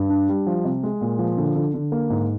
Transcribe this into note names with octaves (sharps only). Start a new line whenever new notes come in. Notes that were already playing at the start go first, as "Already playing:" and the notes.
Already playing: G2
D4
G3
F3
C3
G#3
A#2
F3
D3
D3
D3
A#3
G#2